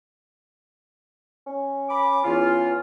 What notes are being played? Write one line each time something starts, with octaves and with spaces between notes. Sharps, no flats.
C#4
B5 D6
E2 C#4 F4